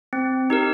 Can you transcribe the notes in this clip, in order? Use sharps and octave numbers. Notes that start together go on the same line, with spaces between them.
C4
D#4 G4 A#4